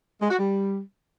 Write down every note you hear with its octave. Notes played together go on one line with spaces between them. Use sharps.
G#3
F#4
G3